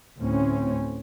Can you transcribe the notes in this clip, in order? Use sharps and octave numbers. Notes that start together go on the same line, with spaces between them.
D2 A2 C4 C#4